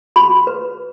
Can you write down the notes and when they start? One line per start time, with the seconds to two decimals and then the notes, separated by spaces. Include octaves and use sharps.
0.16 F#4 B5
0.47 B4